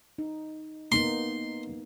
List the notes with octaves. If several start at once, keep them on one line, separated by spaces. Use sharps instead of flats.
D#4
A#3 B3 D#4 C6